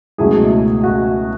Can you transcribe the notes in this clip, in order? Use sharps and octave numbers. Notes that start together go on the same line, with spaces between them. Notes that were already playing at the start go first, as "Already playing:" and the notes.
C#2 B2 F#3 A3 E4 G#4
F#4